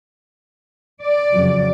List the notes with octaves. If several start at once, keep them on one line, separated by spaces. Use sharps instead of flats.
D5
F2 C#3 F#3